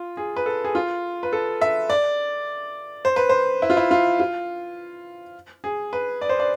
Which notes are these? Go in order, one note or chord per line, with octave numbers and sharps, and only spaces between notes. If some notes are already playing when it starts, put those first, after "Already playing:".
Already playing: F4
G#4
B4
A4
G#4
F4
B4
A4
E5
D5
C5
B4
C5
E4
F4
E4
F4
F4
G#4
B4
D5
C5
D5